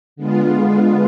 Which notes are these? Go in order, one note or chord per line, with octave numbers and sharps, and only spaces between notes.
D3 G#3 B3 F4